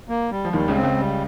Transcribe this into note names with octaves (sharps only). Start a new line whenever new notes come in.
A#3
G3
F3
D#2 D#3 G3
C#2 C#3
C4
C#2 C#3
G3